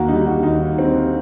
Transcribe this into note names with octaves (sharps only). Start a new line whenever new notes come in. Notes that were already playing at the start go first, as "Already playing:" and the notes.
Already playing: D#2 A#3 F#4
D3 G3 D#4
F#4
D#2 D#4
D3 G3 C4